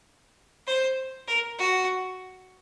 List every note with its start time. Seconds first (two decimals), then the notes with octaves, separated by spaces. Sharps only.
0.67 C5
1.28 A#4
1.58 F#4